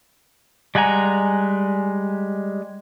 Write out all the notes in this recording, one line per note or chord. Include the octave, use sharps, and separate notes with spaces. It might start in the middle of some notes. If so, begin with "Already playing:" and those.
G3 G#3 F#5 G#5 A#5